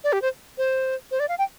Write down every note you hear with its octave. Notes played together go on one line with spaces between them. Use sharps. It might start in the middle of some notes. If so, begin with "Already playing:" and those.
D5
G4
C5
C5
C5
D5
F5
G5